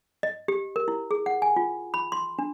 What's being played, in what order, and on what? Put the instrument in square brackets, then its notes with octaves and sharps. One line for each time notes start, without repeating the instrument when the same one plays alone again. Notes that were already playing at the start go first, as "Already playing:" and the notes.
[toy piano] D#5
G4
A#4
E4
G#4
F#5
G#5
F4
B5
C6
D4